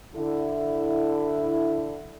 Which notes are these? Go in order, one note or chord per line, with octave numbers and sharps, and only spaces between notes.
D3 E4 A4